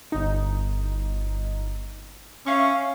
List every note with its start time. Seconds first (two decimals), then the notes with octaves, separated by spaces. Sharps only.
0.12 G1 D#4
2.46 C#4 E5 F5 C#6